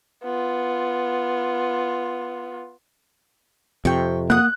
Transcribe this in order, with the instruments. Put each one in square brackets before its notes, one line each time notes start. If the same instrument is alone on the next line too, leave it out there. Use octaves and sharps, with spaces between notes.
[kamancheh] B3 F4
[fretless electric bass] F2 C3 [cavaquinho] G5 C#6
[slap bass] A#3 [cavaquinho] F#5 D#6 [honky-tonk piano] F#6